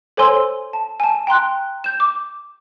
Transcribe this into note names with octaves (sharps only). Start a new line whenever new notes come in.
A4 C5 C#5 G#5 C6 E6
A5
G#5 A5
G5 A#5 C6 F#6
G6 E7
D6